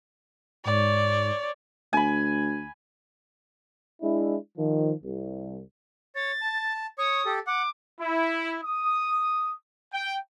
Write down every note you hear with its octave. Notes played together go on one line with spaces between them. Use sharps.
G#2 C#5 D5
D2 G#5 B5
G#3 D4 E4
D#3 F3
C2
C#5 A6
A5
C#5 C#6 D#6
G4 A4
F#5 D6
E4
D#6
G5